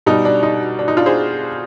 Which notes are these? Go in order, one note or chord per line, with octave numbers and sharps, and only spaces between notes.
B2 G3 D#4
D4
D#4
D4
D#4
D4 F4
G#4 C5